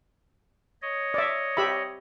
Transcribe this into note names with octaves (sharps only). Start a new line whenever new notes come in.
C#5 D#5
D5 E5
G4 E5 B5